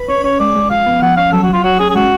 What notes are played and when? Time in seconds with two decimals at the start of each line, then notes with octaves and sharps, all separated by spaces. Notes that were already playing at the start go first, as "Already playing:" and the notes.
Already playing: B4
0.08 C#4 C#5
0.24 C#4 C#5
0.39 G#3 D5
0.55 G#3
0.70 F3 F5
0.86 B3
1.02 F3 F#5
1.17 C#4 F5
1.33 F#3 A4
1.43 F#4
1.48 F#3 F4
1.64 F#4 C#5
1.79 C#4 G#4
1.90 G#4
1.95 G#3 F#4